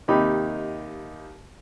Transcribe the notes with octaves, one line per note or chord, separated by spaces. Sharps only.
D#2 C3 D#4 G4 B5